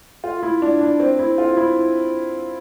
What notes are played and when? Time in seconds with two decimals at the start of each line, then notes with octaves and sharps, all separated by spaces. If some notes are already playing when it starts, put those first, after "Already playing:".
0.24 F4
0.43 E4
0.62 D4
0.81 D4
1.00 C4
1.19 E4
1.38 F4
1.57 E4